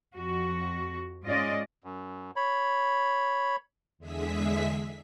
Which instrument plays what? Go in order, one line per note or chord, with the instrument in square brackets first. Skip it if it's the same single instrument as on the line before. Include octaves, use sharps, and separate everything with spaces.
[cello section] F2 F#4
G#2 G#3 C#4 F4 D5 D#5
[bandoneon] F#2
C#5 B5
[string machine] E2 D3 G#3 G#4 E5 B6